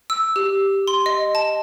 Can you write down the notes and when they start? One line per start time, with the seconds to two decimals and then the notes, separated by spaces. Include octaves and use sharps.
0.10 E6
0.36 G4
0.87 C6
1.06 D#5
1.35 A5